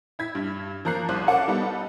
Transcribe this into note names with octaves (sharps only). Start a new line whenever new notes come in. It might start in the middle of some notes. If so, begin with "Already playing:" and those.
E4 G#6 B6
G2
F3 A#3 A#5 F#6 C7
C2 C5 F#6
C#4 A4 A#4 F#5 A5 D6
G3 B3 D#4 A4